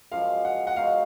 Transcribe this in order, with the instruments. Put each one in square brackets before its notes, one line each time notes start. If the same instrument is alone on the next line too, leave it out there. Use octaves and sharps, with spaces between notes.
[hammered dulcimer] F#2 C#3 F3 G#3 [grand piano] F5
[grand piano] F#5
F#5
[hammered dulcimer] B2 G#3 D#4 F#4 [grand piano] F5